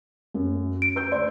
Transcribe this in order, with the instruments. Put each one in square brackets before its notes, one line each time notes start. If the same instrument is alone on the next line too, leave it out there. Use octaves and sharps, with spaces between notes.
[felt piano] F#2
[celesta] D7
[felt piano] B4 E6 G6
[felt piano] D2 C5 C6 [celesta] D5